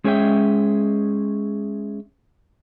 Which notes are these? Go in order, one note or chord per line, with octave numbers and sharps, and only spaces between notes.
G#3 C#4 G#4 C#5 E5 G5